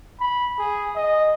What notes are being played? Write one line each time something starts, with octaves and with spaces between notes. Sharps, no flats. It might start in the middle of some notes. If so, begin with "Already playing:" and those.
B5
G#4
D#5